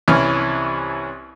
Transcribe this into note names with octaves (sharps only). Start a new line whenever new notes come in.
C2 E3 C#4 F6